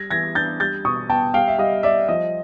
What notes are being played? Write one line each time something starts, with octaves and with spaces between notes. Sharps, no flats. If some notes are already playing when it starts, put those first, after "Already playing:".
Already playing: G3 G#6 A#6
E3 G#6 A#6
D4 G6 A6
G3 G6 A6
B2 C#6 D#6
B3 G5 A5
G3 F5 G5
E5
G3 D#5 F5
G3 D5 E5
F3 D#5